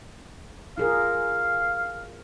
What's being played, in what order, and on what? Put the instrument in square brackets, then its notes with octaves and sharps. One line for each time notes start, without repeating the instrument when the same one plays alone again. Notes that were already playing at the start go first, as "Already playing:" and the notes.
[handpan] F4 G#4 A#4 [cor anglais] F5